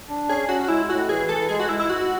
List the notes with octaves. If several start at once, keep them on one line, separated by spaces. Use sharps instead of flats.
D4
C#4 G#4
C#4 F#4
F#4
G#3 E4
A2 F#4
E3 G#4
E3 A4
G#3 G#4
F#4
G#3 E4
E4
G#2 F#4